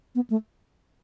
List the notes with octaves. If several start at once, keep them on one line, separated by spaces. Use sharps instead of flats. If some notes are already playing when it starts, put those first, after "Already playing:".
B3
A3